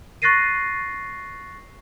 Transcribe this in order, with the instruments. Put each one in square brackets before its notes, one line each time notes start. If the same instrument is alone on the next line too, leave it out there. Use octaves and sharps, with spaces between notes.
[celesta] C#6 F#6 A6 A#6 C7 D#7